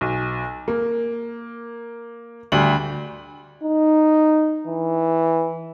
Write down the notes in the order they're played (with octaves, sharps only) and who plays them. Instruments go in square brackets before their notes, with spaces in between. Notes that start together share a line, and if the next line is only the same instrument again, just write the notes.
[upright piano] B1
A#3
D2 G3 F#7
[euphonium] D#4
E3